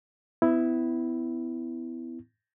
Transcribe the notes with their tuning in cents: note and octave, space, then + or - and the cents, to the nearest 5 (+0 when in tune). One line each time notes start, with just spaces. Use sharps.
B3 +35 E4 +0